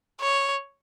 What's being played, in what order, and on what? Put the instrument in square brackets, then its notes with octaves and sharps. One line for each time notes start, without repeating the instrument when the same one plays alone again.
[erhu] C#5